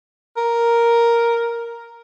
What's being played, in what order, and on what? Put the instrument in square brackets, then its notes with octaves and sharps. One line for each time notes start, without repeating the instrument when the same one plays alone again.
[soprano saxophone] A#4